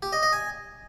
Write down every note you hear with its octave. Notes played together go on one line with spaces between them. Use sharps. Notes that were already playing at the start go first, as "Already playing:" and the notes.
G4
D#5
D#5
G#5